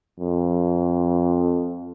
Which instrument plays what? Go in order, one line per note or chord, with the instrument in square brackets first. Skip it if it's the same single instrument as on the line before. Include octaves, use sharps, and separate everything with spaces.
[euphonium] F2